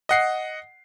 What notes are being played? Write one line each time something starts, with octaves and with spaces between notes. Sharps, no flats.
D#5 F#5 C7